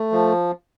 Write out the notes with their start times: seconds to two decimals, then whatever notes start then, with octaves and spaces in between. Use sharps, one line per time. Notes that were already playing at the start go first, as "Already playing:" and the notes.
Already playing: A3
0.12 F3